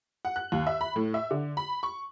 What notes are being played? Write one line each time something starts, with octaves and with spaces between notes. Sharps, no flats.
F#5
F#6
D#2
E5
B5
A2
E5
D3
B5
C#6